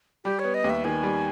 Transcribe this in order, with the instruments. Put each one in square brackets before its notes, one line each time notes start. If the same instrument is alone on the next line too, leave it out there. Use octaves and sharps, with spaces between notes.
[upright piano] G3 [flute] G4
[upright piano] B3 [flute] C#5
[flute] D#5
[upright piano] D#2
[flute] E5
[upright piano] D#3 [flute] G#5
[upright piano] G3